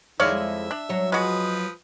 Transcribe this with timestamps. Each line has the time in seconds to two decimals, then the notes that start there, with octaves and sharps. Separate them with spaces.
0.20 F2 D#3 G#3 E4 C#5 D5 F5
0.37 E5
0.71 D4
0.89 F#3 C#5
1.12 F3 G#3 F#4 B4 D#6